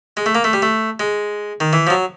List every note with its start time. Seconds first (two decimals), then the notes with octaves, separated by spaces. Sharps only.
0.17 G#3
0.26 A3
0.35 A#3
0.44 A3
0.53 G3
0.62 A3
1.00 G#3
1.60 D#3
1.73 E3
1.87 F3
1.90 F#3